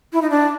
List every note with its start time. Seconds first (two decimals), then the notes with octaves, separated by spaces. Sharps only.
0.13 E4
0.22 D#4
0.30 D4